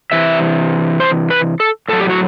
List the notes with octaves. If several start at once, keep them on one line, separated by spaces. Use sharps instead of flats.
C3 E3 E5
C5
B4
A4
A2 F#3 A4
G4
F#4